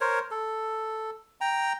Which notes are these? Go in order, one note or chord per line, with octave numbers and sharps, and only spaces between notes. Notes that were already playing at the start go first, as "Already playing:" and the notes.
A#4 C5 C#5
A4
G5 A#5